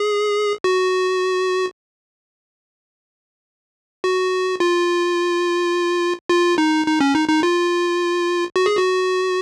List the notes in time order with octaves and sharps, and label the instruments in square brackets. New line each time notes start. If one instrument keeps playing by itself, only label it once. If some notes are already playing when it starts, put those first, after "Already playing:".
Already playing: [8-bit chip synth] G#4
F#4
F#4
F4
F4
D#4
D#4
C#4
D#4
D#4
F4
F#4
G#4
F#4